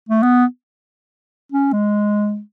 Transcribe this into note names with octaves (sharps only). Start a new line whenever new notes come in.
A3
B3
C#4
G#3